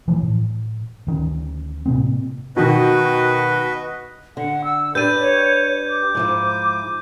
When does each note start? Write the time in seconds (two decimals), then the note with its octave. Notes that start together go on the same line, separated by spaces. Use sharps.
0.08 E3 F3 A3
0.22 A2
1.07 D2 D#3 C#4
1.86 A2 C3 A#3 C4
2.56 B2 D#3 F#4 B4 D#5
4.37 D3 F#5
4.64 E6
4.95 D4 G4 B4 D5 G6 D#7
5.20 C#5
5.90 D6
6.15 G#2 F3 E4